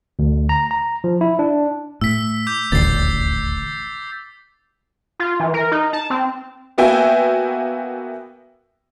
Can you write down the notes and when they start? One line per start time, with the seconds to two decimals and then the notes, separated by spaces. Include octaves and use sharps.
0.19 D2
0.49 A#5
0.71 A#5
1.04 F3
1.21 E4
1.39 D4
2.01 A2 E6 B6
2.47 D6 G6
2.72 D#1 A1 D2 A6 C7
5.20 F4
5.40 E3
5.54 A#4
5.72 D#4
5.93 A5
6.10 C4
6.78 A#3 B3 F#4 E5 G5 G#5